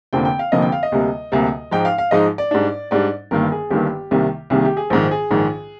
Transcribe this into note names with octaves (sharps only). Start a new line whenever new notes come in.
F1 F2 D3 F3 A#3 G5
G5
F5
F1 F2 D3 F3 A#3 D#5
G5
F5
D#5
D2 C3 G3 A#3
D2 C3 G3 A#3
G#2 F3 G#3 D#4 G5
F5
F5
G#2 F3 G#3 D#4 D#5
D5
G#2 G3 D4
G#2 G3 D4 D5
G1 G2 D#3 A#3 A#4
G#4
G1 G2 D#3 A#3 G4
C2 C3 D#3 G3 A#3
C2 C3 D#3 G3 A#3 G#4
G4
G#4
A#1 G#2 D#3 C5
G#4
A#1 G#2 D#3